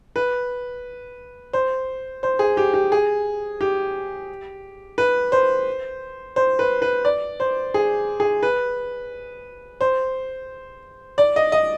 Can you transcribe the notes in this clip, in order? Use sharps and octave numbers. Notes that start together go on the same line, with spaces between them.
B4
C5
C5
G#4
G4
G4
G#4
G4
B4
C5
C5
B4
B4
D5
C5
G#4
G#4
B4
C5
D5
D#5
D#5